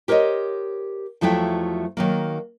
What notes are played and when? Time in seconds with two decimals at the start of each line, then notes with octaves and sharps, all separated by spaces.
0.08 G4 A#4 C5 C#5 D#5
1.21 E2 F3 F#3 A3 E4 G5
1.97 D#3 F#3 A#3